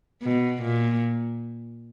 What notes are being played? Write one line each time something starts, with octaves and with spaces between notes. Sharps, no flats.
B2
A#2